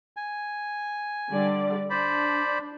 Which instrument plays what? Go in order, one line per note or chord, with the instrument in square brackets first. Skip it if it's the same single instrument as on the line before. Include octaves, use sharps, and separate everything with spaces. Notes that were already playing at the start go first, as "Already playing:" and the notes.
[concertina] G#5
[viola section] D3 G3 D5
[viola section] D4 [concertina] C5 D5 B5